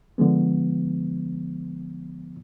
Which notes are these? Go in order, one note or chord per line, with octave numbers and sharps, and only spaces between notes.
D3 F3 G#3 B3